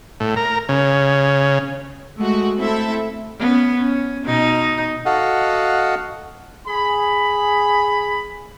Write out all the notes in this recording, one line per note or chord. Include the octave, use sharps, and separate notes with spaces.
A2
A#4
C#3
G#3 A3 F#4
A3 C4 E4 A4 E5
B3 C#4
C#4
B2 D#4
F#4 A4 D#5 F5 F#5
G#4 B5